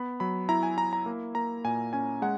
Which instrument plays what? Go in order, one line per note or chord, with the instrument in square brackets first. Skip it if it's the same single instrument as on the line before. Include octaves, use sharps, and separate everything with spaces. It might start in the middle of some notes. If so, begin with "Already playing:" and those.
Already playing: [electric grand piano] B3 B5
F#3 B5
E4 A#5
G#5
E4 A#5
A#5
A#3
A#3 A#5
A#2 G#5
C#4 G#5
G#3 F#5